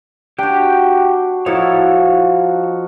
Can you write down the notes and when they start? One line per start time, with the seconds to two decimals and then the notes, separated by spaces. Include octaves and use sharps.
0.38 D4 F#4 G4 G5
1.46 F3 D#4 E4 F#4 A4 C#5